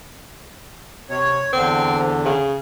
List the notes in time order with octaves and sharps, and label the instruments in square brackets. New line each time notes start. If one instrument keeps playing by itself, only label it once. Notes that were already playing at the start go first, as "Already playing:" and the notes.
[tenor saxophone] C3 [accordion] C#5
[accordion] E2 D3 [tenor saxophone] C4
[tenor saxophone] C#3